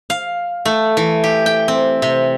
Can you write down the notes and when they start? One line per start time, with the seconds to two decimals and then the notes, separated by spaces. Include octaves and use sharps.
0.10 F5
0.65 A3
0.97 E3
1.24 G4
1.46 G5
1.68 C4
2.02 C3